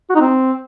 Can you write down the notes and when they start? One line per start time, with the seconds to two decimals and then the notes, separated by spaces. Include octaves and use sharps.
0.10 F#4
0.15 D#4
0.21 C4